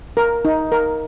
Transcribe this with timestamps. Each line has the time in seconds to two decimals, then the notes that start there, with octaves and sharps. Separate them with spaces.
0.17 A#4
0.45 D#4
0.72 A#4